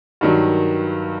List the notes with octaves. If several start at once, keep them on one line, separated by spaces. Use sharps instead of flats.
G2 D#3 F#3